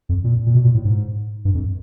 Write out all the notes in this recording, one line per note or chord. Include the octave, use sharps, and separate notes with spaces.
F2
A#2
A#2
B2
A#2
A2
G#2
G2
F2